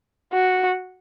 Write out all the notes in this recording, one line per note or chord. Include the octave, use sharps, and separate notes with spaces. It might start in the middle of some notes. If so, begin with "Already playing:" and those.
F#4